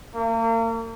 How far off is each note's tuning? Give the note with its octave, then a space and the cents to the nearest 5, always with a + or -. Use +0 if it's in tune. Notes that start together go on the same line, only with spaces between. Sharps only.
A#3 -40